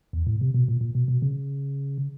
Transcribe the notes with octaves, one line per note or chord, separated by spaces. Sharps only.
E2
A2
C3
B2
A#2
A#2
B2
B2
C#3